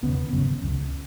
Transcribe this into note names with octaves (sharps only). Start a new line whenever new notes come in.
E1 D#2 C#3 B3
G#1 F#2 C#3
C#2 C#3